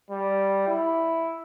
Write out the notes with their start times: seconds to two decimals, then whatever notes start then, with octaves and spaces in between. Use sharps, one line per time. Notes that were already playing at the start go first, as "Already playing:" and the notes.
0.10 G3
0.68 E4